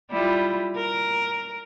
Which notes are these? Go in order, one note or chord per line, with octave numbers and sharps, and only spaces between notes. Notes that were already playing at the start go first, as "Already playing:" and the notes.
G3 E4 F4
A#4